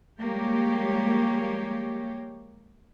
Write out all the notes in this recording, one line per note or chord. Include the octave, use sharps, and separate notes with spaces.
F3 G3 G#3 A#3 G4 C#5